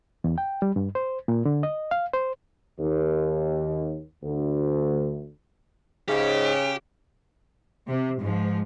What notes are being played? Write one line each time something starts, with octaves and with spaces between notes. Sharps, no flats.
E2
G5
G3
G2
C5
A#2
D3
D#5
F5
C5
D#2
D2
G#2 C#3 G4
C3
G#2 F3